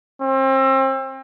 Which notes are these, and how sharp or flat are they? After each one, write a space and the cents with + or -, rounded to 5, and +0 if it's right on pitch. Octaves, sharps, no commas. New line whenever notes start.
C4 +35